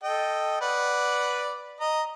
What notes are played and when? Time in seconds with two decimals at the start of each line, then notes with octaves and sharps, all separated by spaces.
0.04 A4 D#5 G5
0.61 B4 D5 F#5
1.80 D#5 A#5